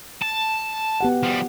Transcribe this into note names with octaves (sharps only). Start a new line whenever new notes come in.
A5
B3 G4 F#5
F3 G3